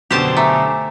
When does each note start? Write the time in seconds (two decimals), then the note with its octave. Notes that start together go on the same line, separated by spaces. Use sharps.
0.11 F#2 B2 D3 G4 C5 A5
0.37 A3 G#5 A#5 D6